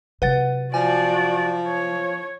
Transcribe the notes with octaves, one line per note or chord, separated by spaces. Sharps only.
C3 F#3 B4 F#5 A6
F3 F#4 D5 G#5
C#5